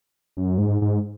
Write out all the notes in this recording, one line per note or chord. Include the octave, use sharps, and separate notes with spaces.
F#2
G#2
G#2